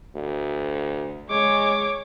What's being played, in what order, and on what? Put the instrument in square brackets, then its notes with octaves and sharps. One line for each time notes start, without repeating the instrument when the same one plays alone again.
[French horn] D2
[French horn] G#3 [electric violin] C#5 D6